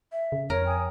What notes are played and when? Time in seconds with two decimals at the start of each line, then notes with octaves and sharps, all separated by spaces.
0.12 E5
0.32 C#3
0.50 F2 A#4 C#5
0.67 G5 G#5 D#6